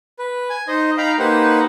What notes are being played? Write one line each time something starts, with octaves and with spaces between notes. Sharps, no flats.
B4
G#5
D#4 C5 D#5
D#4 F5 G5 A#5 B5
A#3 D#4 G4 B4 C5 F#5